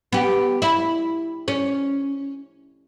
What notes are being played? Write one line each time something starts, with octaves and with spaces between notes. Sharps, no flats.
B3 G4
E4
C#4